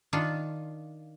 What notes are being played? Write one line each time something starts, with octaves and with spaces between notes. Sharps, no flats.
D#3 D4 F4